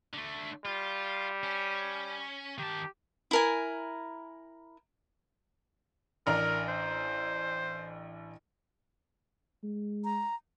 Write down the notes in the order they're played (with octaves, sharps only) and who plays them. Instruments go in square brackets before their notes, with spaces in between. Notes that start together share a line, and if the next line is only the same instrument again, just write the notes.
[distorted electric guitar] D3 A3
[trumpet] G3 [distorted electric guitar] F4
[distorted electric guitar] C#4
[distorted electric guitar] D#3 A5 [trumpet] G4
[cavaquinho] E4 A#4 G#5
[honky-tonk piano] A1 D4 A#5 [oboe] A#4
[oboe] C5
[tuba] G#3
[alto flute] A#5